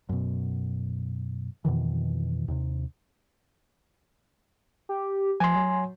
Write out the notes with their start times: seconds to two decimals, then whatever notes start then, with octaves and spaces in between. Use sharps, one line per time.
0.09 F#2 B2
1.65 F2 B2 D#3 E3
2.48 D#2 C3
4.89 G4
5.40 F3 G#5 C6
5.55 F#3